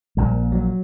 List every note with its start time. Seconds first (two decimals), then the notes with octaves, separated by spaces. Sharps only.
0.17 A#1 A#2 G3
0.52 F#3